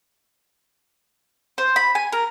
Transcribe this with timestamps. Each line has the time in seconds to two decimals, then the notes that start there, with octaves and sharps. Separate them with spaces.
1.58 C5
1.76 B5
1.95 G#5
2.12 A#4